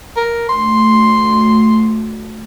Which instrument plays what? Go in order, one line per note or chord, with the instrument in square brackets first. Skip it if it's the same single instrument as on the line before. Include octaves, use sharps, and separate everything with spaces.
[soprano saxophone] A#4
[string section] D2 [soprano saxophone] C6